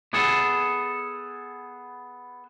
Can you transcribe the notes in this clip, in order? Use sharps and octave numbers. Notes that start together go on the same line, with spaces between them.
B3 G#4 A4